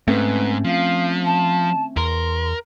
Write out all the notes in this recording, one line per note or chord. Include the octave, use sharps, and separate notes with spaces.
G#2 A3 C4 C#4 B4
F3 F5
A5
E2 A#4 C6